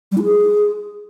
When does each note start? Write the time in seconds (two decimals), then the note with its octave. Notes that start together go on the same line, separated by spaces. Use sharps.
0.12 G3
0.17 E4
0.23 G#4